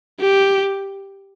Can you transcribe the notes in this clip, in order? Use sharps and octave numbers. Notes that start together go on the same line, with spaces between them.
G4